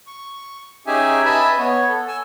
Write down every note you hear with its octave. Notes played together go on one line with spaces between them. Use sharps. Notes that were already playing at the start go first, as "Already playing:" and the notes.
C#6
C#4 D#4 G4 G#4 E5 G#5
B4 D#5 E5 G#5 A5 B5
B3 C#5
A4
G#5 E6